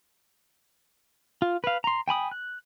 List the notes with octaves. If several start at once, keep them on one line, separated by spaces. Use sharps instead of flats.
F4
B4 F5
A#5 C6
G5 G#5 B5 D#6
F#6